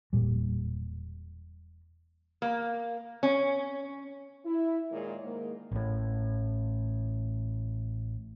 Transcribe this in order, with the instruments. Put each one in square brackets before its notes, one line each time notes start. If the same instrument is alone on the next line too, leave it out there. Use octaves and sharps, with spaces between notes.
[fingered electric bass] E1 A#2 G3
[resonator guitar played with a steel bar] A#3
C#4
[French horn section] E4
A#2 D#3 G#3 G#4 A#4 C#5
G#2 D#3 A#3
[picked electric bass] A1 A2